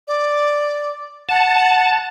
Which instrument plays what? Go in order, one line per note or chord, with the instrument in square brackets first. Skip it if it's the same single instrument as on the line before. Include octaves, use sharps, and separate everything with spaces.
[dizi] D5
[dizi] F#5 [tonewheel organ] A5